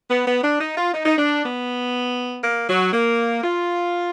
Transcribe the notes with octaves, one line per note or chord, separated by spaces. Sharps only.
B3
B3
D4
D#4
F4
D#4
D#4
D4
B3
A#3
F#3
A#3
F4